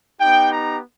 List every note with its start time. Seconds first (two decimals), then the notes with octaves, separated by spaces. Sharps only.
0.19 B3 D#4 G4 G5
0.51 A#5